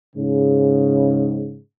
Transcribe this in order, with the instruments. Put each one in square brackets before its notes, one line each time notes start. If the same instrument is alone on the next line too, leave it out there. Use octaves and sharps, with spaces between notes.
[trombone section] G#2 C#3